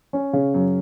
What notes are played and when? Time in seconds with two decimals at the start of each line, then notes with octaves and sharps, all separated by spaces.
0.13 C#4
0.33 C#3
0.54 F#2